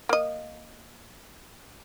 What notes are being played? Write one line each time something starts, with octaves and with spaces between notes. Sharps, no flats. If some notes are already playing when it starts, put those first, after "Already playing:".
A#3 D#5